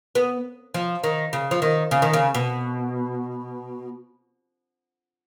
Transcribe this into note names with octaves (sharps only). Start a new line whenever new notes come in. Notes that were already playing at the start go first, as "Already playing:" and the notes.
B3
F3
D#3
C#3
F3
D#3
C#3
D#3
C#3
B2